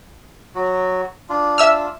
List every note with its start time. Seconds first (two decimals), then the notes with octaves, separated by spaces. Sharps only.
0.55 F#3 F#4
1.30 D4 F4
1.58 E5 E6 F6